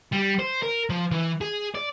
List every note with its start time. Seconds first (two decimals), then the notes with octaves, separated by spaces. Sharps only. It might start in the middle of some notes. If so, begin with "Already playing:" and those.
0.13 G3
0.39 C5
0.63 A#4
0.90 F3
1.11 E3
1.41 G#4
1.75 D5